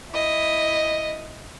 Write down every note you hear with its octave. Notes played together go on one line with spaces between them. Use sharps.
E4 D#5